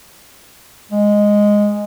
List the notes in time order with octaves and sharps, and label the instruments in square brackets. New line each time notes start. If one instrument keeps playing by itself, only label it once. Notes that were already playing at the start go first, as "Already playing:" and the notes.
[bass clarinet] G#3